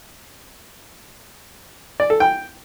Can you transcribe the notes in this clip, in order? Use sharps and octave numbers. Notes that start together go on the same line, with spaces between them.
D5
A4
G5